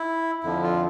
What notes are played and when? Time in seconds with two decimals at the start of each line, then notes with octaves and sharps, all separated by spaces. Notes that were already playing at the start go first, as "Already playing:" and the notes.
Already playing: E4
0.43 F2 D3 F3 E4
0.63 F4